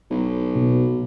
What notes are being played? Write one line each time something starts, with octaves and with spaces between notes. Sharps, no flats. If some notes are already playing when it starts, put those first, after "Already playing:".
B1
B2